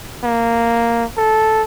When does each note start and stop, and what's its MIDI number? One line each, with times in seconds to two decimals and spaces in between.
0.24 1.04 58
1.17 1.62 69